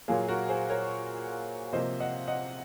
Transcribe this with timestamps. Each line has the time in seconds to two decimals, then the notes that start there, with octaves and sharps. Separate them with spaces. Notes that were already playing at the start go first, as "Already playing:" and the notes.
0.08 A#2 F#3 A#3 F4 G#4
0.28 F#4 A#4
0.49 G#4 C5
0.70 A#4 C#5
1.73 C3 F3 A#3 C5 D#5
2.00 D#5 F#5
2.27 D#5 F#5